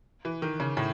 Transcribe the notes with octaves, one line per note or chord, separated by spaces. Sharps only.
E3
D#3
C#3
A2